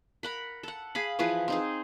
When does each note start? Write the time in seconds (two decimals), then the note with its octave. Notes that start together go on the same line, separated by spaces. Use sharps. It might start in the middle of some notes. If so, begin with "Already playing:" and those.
0.23 A#4 F#5 B5
0.63 A4 F#5
0.95 G#4 F5 B5
1.19 E3 F3 G#4 B4
1.48 C4 D#4 G#4